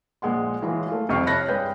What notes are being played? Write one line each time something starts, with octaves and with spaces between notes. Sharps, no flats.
A#1 G#3 F#5 C6
E3 F#3 G#3 F4
A3 F4
C2 F2 C3 C#6 F6 C7
C#5 A5 B5 F#6 A6 A#6
G2 G#3 B4 G5 G6